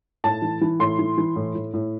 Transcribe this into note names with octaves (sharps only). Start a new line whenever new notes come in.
A2 A5
E3
E3
A2 C6
E3
E3
A2
A2
A2